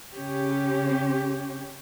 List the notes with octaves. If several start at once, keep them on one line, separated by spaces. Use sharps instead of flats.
C#3 C#4 G4